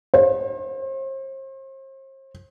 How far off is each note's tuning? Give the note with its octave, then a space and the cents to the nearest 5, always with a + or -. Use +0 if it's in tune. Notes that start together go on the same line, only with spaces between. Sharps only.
C5 +40